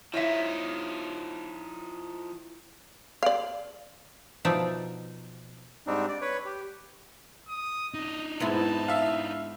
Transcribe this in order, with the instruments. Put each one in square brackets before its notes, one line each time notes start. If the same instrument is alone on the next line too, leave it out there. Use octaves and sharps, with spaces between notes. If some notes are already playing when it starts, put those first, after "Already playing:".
[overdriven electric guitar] F3 D#4 [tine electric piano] E4 [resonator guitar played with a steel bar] C#5 D#5 E5
[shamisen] D5 F5
[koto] B2 F3 D#4 D5 E5
[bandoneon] G#2 G3 C4 D4 D#4
D5
B4 C#5
G4
[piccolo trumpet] D#6
[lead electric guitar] D4 D#4 [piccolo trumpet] D#5
[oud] G#2 B3 E4 [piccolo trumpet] A5
[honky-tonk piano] E5 F5